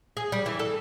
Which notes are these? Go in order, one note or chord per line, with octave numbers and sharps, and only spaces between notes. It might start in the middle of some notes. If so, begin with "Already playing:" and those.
G#4
G3
E3
A4